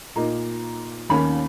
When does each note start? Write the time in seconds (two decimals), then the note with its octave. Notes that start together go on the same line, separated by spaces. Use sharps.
0.16 A#2 A#3 D#4 A#5
1.09 D#2 D#3 A#3 C#4 B5